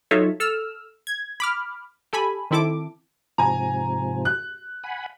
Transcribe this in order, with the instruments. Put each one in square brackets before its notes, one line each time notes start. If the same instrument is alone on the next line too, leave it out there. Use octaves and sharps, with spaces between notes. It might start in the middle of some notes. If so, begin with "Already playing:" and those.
[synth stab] F#3 D#4 F4 A4 C#5 E5
A4 E6 F6
G#6
B5 D6 F6
G4 A4 G#5 B5
D#3 C4 E4 A4 D6
[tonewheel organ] G#2 C3 F3 [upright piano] G#5 A#5
[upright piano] F#6
[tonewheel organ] F#5 G#5 B5